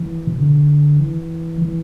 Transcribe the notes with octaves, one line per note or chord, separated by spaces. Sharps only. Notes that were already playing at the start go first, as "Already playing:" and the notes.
Already playing: E3
B2
D3
E3
E3